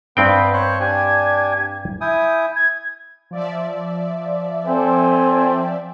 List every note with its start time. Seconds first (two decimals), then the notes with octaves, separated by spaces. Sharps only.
0.17 G2 B3 C4 B4 G5
0.54 C5 C#5 F#6
0.80 D4 G4 G#5 G#6
2.01 E4 G#5 D#6 G6
2.55 G#6
3.31 F3 D5 E5
4.65 C4 A4 C5 G#5